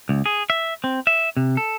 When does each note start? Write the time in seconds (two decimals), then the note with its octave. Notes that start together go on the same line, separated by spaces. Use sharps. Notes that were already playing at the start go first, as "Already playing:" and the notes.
0.09 C#2
0.26 G#4
0.50 E5
0.84 C4
1.07 E5
1.37 C3
1.57 A4